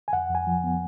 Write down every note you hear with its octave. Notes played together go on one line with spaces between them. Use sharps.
G#5
F2 F#5
F2 G#5
F3
B3